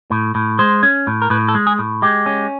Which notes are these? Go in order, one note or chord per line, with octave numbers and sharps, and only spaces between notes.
A2
A2
G#3 C5
C#4
A2
A#4
A2 B4
A4
G#3
G#4
A2
G#3 G4
C#4